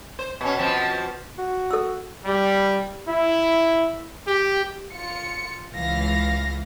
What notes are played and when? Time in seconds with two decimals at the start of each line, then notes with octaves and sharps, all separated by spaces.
0.19 C5
0.41 B2 C#4
0.58 B2 F3 C4
1.38 F#4
1.71 A4 E6
2.25 G3
3.08 E4
4.26 G4
4.93 F4 C#7
5.73 C#2 E3 F5 A#6